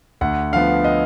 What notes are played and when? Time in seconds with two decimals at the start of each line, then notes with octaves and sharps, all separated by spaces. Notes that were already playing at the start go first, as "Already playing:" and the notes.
0.21 D2 F#5
0.52 D3 F3 B3 F5
0.84 D#5